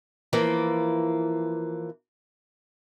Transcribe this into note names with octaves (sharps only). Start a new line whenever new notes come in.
E3 F3 A#3